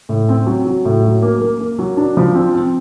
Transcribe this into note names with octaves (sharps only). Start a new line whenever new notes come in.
A2
C4
F#3
F#3
A2
F#3
A#3
A#3
A#3
F#3
D4
F3
C4
C4